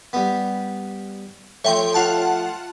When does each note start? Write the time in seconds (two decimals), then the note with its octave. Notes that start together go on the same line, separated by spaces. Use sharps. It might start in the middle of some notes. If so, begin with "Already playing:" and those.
0.13 G3 B3
1.64 F3 A3 C#5 G5 C6
1.94 F4 F#5 A5